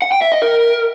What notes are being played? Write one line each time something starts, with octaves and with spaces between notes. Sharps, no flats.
F#5
G5
E5
D#5
A#4